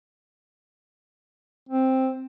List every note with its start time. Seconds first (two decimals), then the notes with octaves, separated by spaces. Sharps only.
1.69 C4